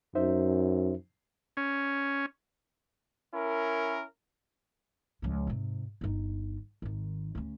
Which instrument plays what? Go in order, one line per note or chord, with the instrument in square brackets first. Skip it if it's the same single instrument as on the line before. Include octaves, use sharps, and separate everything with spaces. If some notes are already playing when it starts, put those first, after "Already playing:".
[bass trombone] F#2 [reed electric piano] D#4 C5 E5
[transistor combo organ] C#4
[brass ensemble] C#4 E4 A#4
[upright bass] C#2 F3
G#2 C3
G1 D#4
G#1 D#3
D2 C#4